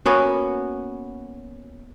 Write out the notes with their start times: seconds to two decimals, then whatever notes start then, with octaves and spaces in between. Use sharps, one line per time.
0.06 A#3 B3 C#4 F#4